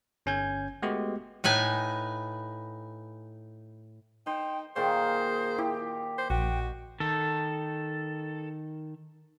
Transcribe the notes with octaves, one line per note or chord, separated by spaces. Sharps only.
G1 C#4 G#5 G6 G#6
G#3 A3 B3 F#4 G4
A2 D#4 B4 G#5
D#4 C5 G5
A#2 D#3 G#4 C5
E4 G4
C5
A#1 F#4 G5
D#3 A4